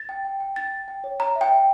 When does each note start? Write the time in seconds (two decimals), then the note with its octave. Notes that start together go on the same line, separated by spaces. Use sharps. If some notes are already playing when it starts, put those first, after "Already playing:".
Already playing: A6
0.09 G5
0.25 G5
0.40 G5
0.56 G5 A6
0.72 G5
0.88 G5
1.04 C#5
1.20 C#5 A#5
1.36 E5
1.41 G5
1.52 E5